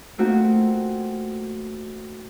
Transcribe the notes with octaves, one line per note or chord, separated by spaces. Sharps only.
A3 A#3 C4 D#4 F4 F#4